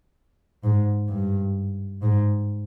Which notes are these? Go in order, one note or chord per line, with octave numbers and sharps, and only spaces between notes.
G#2
G2
G#2